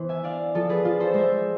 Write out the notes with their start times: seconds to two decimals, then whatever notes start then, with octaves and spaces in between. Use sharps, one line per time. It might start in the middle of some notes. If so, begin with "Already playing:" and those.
Already playing: E3 B3 C5
0.09 E5 G#5
0.24 D4 D5 F5
0.55 F3 F4 A4
0.69 G#4 B4
0.85 D4 F4
1.00 A4 C5
1.14 G#3 C5 E5